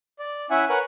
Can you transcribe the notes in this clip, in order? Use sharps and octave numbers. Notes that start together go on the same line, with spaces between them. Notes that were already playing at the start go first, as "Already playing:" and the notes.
D5
C#4 E4 E5 F#5 G#5
A#4 B4 C#5 F#5 G#5